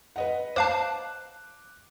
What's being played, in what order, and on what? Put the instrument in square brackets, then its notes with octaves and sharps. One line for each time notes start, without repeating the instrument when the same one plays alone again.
[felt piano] B4 D#5 F#5
[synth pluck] C5 F5 A5 [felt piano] D6 F#6